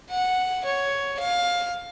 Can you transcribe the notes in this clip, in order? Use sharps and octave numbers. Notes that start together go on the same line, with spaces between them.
F#5
C#5
F5